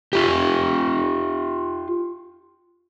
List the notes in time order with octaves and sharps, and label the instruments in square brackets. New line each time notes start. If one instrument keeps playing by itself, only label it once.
[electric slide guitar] F4 G4